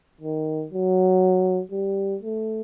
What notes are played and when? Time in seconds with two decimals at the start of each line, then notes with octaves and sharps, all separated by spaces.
0.21 D#3
0.71 F#3
1.72 G3
2.22 A3